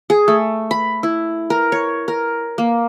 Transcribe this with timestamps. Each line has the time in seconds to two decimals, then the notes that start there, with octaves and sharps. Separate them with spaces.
0.10 G#4
0.28 A3
0.71 B5
1.03 E4
1.50 A#4
1.72 C#5
2.08 A#4
2.58 A#3